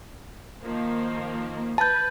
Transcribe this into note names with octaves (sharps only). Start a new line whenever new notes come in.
D#3 F3 A#3
B4 A5 G6